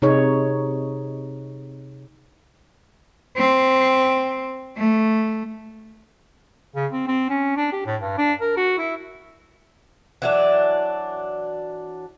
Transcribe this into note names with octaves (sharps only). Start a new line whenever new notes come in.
C3 D#4 G#4 C#5
C4
A3
C#3
C4
C4
C#4
D4
G4
A2
G2
D4
A#4
F#4
E4
E3 F#3 D4